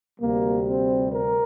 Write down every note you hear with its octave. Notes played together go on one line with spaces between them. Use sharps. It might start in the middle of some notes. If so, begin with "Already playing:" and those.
D2 C3 G3 A#3
C4
A#4